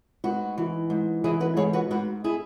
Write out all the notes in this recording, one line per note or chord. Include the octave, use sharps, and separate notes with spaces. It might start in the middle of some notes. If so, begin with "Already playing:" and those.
G#2 F#4 B4
E3
G#2
E3 E4 G#4
F#4 B4
G#2 G#4 C#5
F#4 B4
G#2 F#4 B4
E4 G#4